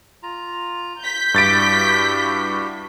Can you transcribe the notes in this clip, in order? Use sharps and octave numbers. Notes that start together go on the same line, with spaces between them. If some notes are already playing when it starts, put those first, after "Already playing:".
F4 A#5
G6 B6
G2 E4 F#4 G4 A6 D7